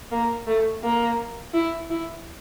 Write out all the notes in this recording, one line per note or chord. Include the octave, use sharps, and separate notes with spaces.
A#3
A3
A#3
E4
E4